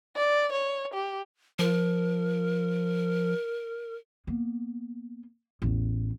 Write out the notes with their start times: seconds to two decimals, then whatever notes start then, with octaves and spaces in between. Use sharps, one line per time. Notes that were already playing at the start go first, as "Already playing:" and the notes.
0.16 D5
0.52 C#5
0.94 G4
1.59 F3 A#4
4.27 A#3 B3
5.62 A1 E2